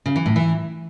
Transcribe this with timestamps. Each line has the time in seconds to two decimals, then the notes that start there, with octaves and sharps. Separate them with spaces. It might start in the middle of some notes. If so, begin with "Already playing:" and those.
0.06 C#3
0.16 E3
0.26 A2
0.36 E3